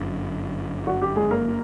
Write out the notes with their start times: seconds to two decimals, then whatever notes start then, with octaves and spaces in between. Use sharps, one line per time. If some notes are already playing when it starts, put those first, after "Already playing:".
Already playing: G1 F#2 D3
0.87 F#4
1.02 G4
1.16 G#3 G#4
1.31 A#3 A#4